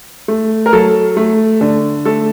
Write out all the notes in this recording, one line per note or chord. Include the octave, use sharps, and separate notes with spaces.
A3
A#4
F#3 A4
A3
D3
A3 A4